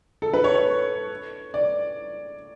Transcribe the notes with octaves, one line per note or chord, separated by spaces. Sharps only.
A4
B4
C#5
C#5
D5